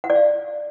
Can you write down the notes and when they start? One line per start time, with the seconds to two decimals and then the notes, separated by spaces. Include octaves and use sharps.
0.04 F#5
0.10 D5
0.15 F5